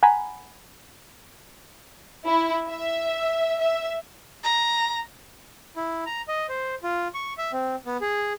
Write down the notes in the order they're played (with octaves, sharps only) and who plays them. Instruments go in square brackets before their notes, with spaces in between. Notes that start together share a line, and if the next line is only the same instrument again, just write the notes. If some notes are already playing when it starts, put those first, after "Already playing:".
[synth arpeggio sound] F#5 G#5 A#5 B5
[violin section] E4
E5
E5
[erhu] A#5
[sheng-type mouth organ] E4
A#5
D#5
C5
F4
C#6
E5
C4
B3
G#4